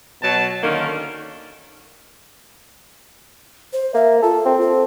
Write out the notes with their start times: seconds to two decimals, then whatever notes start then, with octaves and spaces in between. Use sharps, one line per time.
0.21 B2 F#3 A5
0.62 D3 D#3 A#3 C#4
3.73 C5
3.94 A#3 E5
4.23 F4 A4
4.46 C4
4.61 A4